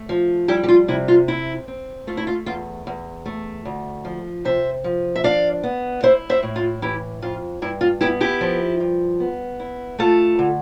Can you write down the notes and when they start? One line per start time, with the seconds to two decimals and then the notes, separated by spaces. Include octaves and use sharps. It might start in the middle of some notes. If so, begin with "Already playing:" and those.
Already playing: A3
0.09 F3
0.48 G3 E4 G4
0.63 G4
0.68 F4
0.88 C3 E4
1.08 F4
1.28 C4 E4
1.68 C4
2.07 A3 F4
2.17 E4
2.27 F4
2.46 E2 F4
2.87 E2
3.26 A3
3.65 D2
4.05 F3
4.45 C3 C5 E5
4.84 F3
5.16 E5
5.24 D4 D5 F5
5.63 B3
6.03 E4 C5 E5
6.29 C5 E5
6.43 A2
6.56 F4
6.82 E3 E4 G4
7.22 F2 F4
7.62 G2 E4
7.81 F4
8.01 B3 E4 G4
8.21 E4 G4
8.41 F3
8.80 G2
9.20 B3
9.60 E4
9.99 A3 F4 A4
10.39 D3